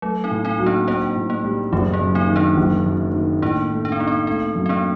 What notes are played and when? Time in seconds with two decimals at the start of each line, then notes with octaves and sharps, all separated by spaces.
0.02 F#3 A3
0.24 C4 D#4
0.31 A2
0.45 C4 D#4
0.59 F#3
0.66 A#3 D4
0.87 A#3 C4 D4
1.16 A2
1.30 A#3
1.44 G3
1.73 F#1 A3
1.93 A#3
2.01 F#2
2.15 C4 D#4
2.29 D#3
2.36 A#3 D4
2.58 F#1
2.86 F#2
3.14 D#3
3.42 A2 A#3 D4
3.71 A3
3.85 D4
3.92 C4
3.99 A#3 D#4
4.07 C4
4.27 A3 C4
4.55 F#2
4.66 C4
4.69 A#3 D4